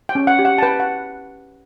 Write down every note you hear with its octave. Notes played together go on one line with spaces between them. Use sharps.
G5
C#4
F#5
G4
F#5
A5
B4 G5
F#5